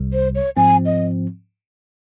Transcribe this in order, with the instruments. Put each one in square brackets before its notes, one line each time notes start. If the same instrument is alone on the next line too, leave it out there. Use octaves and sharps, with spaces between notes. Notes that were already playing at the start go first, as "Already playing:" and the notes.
Already playing: [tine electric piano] C2 C3 G3
[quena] C5
C#5
[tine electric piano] G#2 F3 C4 [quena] G#5
[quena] D#5